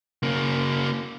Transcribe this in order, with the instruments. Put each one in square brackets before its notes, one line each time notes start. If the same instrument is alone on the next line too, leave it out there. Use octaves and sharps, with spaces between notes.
[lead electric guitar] C#3 A#3